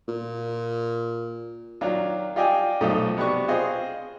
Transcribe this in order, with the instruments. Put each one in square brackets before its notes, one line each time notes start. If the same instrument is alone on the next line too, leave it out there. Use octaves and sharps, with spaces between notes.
[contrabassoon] A#2
[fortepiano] D#3 F#3 D4 F4
F4 G4 D5 D#5 G5 G#5
B1 F3 A3 D#4 D#6
C3 B3 D4 F#4 C#6
C4 F4 G#4 C5 D#5